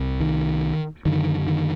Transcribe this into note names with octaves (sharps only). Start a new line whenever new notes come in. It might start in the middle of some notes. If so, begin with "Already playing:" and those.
Already playing: C2 C3
D#3
F#2 D3 D#3
D#3